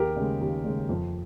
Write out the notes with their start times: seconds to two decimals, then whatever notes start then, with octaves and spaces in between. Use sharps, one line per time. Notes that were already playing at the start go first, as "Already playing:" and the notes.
Already playing: D#2 G4 A#4
0.16 C#3 G#3
0.41 D#2
0.64 C#3 G#3
0.89 F2